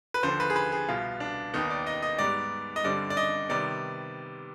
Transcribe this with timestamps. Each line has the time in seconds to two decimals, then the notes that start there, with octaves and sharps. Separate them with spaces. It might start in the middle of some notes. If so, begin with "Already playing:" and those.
0.14 B4
0.23 D#2 D3 F3 C5
0.40 B4
0.50 G#4
0.56 B4
0.72 G#4
0.88 C2 B2 B3 F4
1.20 D4
1.53 D#2 D#3 B3 D#4
1.70 D5
1.87 D#5
2.02 D#5
2.19 G#2 G3 B3 D5
2.76 D#5
2.84 G2 D3 G3 C4 D5
3.10 D5
3.17 D#5
3.49 C3 D#3 G3 B3 D5